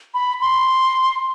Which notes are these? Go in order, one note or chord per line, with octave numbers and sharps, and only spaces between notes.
B5
C6